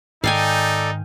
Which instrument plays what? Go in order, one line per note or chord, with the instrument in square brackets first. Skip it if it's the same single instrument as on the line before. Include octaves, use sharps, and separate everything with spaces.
[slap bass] G#2 D#3 [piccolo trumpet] D#4 [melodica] A4 D5 [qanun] F5 G5 G#5